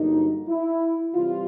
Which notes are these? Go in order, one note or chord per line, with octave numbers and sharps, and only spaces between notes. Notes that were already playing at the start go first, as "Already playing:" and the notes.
Already playing: G2 D3 F#3 A#3 D#4
E4
C3 E3 G3 F4